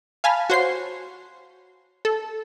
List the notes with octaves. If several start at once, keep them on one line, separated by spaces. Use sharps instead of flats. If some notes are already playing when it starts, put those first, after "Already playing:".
F5 G#5 A5 B5 F6
F#4 C5 C#5 C7
A4